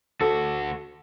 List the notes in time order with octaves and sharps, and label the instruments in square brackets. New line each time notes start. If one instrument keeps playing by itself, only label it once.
[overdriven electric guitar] D2 F#4 [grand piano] A4